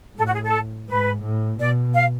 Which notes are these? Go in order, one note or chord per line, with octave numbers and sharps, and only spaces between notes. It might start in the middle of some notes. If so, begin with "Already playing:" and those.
A2 A4
F#4
G#4
A4
G#2 B4
A2
B2 D5
F5